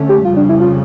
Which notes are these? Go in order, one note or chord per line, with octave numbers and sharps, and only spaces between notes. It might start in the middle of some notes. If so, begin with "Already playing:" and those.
Already playing: D3 A3 C#4
G4
F2 C#3 G3 F4
D4
E4
F4